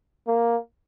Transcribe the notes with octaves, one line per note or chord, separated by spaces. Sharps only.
A#3